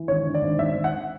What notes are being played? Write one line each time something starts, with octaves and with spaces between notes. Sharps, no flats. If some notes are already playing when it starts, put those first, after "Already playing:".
Already playing: E3
G#1 C#5
D3
D5
G#1
G#1 E5
G#1
F#5